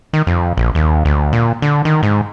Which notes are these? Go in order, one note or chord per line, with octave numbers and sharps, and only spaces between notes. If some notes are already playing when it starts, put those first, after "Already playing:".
D#3
F2
A#1
D#2
D2
A#2
D3
D#3
G#2